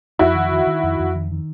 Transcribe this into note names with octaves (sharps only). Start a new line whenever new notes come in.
F2 E4 F#4
D#3
D#3
D#3
F2
F2
D#3
D#3